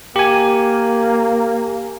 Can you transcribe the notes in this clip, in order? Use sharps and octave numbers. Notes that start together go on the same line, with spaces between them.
A#3 G4 G#5